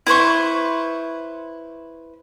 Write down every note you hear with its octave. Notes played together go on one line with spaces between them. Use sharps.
E4 B4 C5 C#6